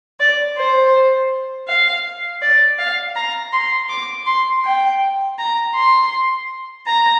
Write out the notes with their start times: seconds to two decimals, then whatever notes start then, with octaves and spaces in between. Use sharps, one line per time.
0.19 D5
0.57 C5
1.67 F5
2.41 D5
2.78 F5
3.15 A#5
3.52 C6
3.89 D6
4.26 C6
4.64 G5
5.38 A#5
5.74 C6
6.86 A#5